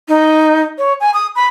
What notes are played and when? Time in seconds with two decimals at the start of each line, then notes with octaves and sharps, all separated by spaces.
0.08 D#4
0.78 C#5
1.00 G#5
1.14 D#6
1.35 B5